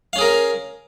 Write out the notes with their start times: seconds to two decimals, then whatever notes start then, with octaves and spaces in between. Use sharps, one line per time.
0.13 F5
0.16 C#4
0.18 G#4
0.21 A#4